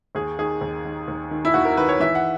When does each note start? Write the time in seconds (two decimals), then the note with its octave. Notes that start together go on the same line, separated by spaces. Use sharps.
0.15 D#2 G#4
0.38 D#3 G#4
0.61 D#2
0.85 D#3
1.08 D#2
1.31 D#3
1.45 E4
1.54 D#2 F#4
1.65 A#4
1.77 D#3 B4
1.89 C#5
2.00 E3 E5
2.15 F#5